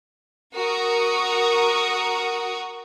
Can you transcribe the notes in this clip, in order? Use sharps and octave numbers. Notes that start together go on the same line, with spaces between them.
F#4 A#4 A#5 C#6 D#6